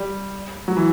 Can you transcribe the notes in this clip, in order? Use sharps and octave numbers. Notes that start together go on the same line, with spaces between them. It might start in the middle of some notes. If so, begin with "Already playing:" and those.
Already playing: G3
F#3
E3